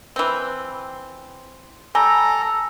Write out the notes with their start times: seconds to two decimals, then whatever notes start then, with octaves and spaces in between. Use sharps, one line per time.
0.16 E3 C4
1.95 G3 A4 G#5 A#5